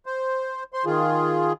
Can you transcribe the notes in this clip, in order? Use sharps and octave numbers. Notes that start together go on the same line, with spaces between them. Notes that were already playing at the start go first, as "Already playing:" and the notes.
C5
C5 C6
D#3 F4 G#4